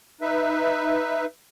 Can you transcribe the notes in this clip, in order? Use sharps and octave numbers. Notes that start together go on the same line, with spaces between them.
D#4 B4 E5